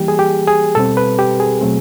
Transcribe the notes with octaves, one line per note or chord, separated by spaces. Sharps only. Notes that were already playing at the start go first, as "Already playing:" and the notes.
Already playing: E3 G3 A#3 G4
G#4
G4
G#4
B2 G3 C4 A4
B4
G4
G#4
B2 F#3 A3 C4